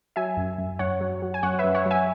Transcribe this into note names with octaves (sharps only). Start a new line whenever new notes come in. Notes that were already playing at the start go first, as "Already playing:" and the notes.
F#3 E5 G#5
F#2
F#2
F#2 C#5 F#5
F#3
F#3
G#5
F#2 C#5 F#5
B4 E5
F#2
C#5 F#5
F#3
E5 G#5